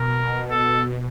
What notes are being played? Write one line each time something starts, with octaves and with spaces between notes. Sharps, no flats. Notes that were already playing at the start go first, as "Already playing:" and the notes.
Already playing: B2 A#4
A4